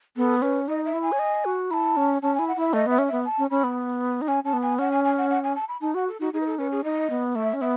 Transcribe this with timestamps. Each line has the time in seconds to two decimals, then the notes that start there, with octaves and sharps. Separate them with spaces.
0.17 B3 A4
0.42 C#4 B4
0.68 D#4 D#5
0.85 E5
0.93 E4
1.02 G#5
1.12 C#5
1.19 D#5
1.45 F#4
1.70 E4 A5 B5
1.97 C#4
2.22 C#4 A5
2.35 G#5
2.39 E4
2.48 F#5
2.56 E4 E5
2.73 A3 D#5
2.86 B3 E5
2.98 C#4
3.08 B3 E5
3.25 A5
3.38 C#4
3.50 C#4 B5
3.64 B3
4.21 D#4
4.27 C#4 G#5
4.44 C#4 A5
4.53 B3
4.62 G#5
4.79 C#4 F#5
4.91 G#5
5.04 G#5
5.17 F#5
5.30 F#5
5.43 G#5
5.55 A5
5.68 B5
5.81 D#4 A5
5.94 F#4 F#5
6.08 A4
6.20 D#4 F#4
6.33 D#4 G#4
6.40 B4
6.46 A4
6.58 C#4 B4
6.71 G#4
6.84 D#4 D#5
7.10 B3
7.35 A3 E5
7.53 C#4
7.61 B3 E5